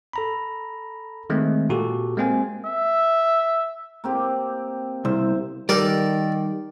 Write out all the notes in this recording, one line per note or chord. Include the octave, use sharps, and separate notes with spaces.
A4 A#5 B5
D#3 G#3 A3 C4
A#2 F#4 G4 A4
G#3 A#3 C4 C5 G#5
E5
A#3 C4 G4
C2 C5 E5
D#3 G3 A4 A#4 D5